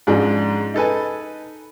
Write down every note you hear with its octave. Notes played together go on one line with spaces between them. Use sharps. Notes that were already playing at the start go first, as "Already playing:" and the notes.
G#2 F3 G#3 C#4 D4
D#4 A4 B4 G#5